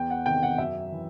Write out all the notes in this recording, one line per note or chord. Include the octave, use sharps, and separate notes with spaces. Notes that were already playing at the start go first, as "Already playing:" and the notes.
Already playing: E2 G5
F#5
C3 D#3 G5
F#5
F#2 E5
E3